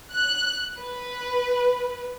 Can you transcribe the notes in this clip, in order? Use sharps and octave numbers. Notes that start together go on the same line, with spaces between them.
F#6
B4